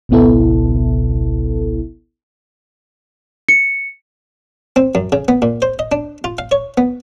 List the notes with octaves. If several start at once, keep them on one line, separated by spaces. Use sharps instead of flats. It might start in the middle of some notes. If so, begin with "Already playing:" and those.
G#1 C#2 B2 B3 E4 A4
C#7
C4
F#2
C#3
B3
A#2
C5
D#5
D4
F4
F5
C#5
B3